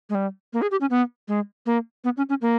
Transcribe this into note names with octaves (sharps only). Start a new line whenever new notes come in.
G#3
G3
A#3
G#4
G4
C#4
B3
G#3
A#3
B3
C#4
C#4
A#3